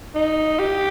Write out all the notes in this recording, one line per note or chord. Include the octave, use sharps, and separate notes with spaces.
D#4
G4